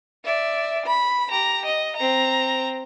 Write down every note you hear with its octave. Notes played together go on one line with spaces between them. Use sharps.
D5 E5
B5
G4 A#5
D#5
C4 A#5